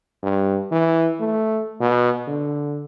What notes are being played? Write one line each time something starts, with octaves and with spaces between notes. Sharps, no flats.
G2
E3
A3
B2
D3